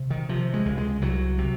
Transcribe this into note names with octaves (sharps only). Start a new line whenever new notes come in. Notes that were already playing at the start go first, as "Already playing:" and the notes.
Already playing: C3
D#3
C3 F3
G#3
C#2
G#3
C2 F#3
C3